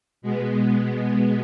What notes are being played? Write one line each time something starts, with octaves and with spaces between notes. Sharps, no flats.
B2 G#3 B3